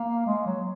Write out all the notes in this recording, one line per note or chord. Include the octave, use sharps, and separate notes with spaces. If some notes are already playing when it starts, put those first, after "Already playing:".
Already playing: A#3
G#3
F#3